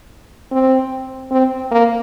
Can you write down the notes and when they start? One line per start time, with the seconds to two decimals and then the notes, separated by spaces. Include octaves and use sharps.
0.52 C4
1.31 C4
1.71 A#3